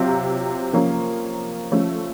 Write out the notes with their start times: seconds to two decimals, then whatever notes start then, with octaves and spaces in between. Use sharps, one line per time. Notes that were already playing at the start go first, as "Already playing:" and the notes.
Already playing: C3 F#3 C4 F4
0.73 F3 A#3 C#4 F4
1.72 F3 A3 C#4 F4